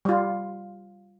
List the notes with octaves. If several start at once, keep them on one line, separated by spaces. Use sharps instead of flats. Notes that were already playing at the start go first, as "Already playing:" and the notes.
G3 F4